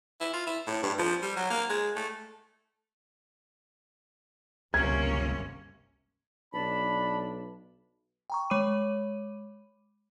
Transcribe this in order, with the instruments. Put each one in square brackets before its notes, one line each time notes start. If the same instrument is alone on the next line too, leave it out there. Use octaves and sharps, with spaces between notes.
[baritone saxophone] E4
F4
E4
A2
G2
F3
G3
F#3
A#3
G#3
A3
[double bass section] G1 F#2 C3 [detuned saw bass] C#2 [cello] A#3 C#4 [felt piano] G#6
[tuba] B1 [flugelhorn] D4 [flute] A5 [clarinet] B5
[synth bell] G5 A#5 C#6
G#3 C#5 B5 D6 D#7